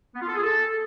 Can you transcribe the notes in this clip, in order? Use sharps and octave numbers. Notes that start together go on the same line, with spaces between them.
B3
F4
A4
G#4
A4